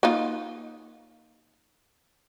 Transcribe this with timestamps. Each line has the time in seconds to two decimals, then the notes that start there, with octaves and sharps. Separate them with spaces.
0.03 A#3 D#4 F4